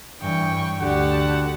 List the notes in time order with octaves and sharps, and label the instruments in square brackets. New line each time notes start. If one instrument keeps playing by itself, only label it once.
[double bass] G2 E3 [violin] G5 C#6
[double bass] D2 [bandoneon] D3 [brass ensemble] F#4 F#5 [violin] G4 A5